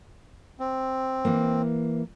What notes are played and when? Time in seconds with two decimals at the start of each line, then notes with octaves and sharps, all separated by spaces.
0.60 C4
1.25 E3 A#3